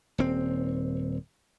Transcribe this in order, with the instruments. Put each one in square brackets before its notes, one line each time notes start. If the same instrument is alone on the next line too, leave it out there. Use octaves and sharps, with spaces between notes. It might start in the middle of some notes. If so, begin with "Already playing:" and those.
[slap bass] D#1 C4